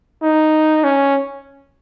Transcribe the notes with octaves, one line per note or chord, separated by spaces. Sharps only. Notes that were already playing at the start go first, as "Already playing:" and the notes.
D#4
C#4